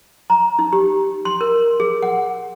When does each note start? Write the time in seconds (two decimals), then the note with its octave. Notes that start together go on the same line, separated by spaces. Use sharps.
0.30 A#5
0.59 D#4
0.73 G4
1.25 C6
1.41 A#4
1.80 G#4
2.02 F#5